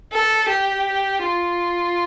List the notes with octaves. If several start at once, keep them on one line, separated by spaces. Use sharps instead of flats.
A4
G4
F4